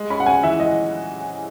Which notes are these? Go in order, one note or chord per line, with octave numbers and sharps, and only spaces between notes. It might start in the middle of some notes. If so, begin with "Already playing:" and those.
Already playing: G#3
C#4 B5
F#5
C#4 G#5
E3 E5
G#3 D#5